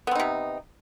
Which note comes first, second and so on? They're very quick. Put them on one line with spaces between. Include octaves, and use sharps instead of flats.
B3 C4 D#4 C3